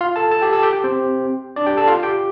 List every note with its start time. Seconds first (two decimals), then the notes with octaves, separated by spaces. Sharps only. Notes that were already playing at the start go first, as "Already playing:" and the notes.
0.01 F4 F5
0.16 A4 A5
0.31 A4 A5
0.42 G4 G5
0.53 A4 A5
0.63 G4 G5
0.73 G4 G5
0.84 C4 C5
1.56 D4 D5
1.67 G4 G5
1.77 A4 A5
1.87 F4 F5
2.03 G4 G5